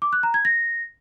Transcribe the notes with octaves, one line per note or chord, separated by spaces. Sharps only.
D6
F#6
A#5
G#6
A#6